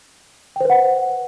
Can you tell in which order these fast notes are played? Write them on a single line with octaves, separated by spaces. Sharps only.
G5 C5 B4 F#5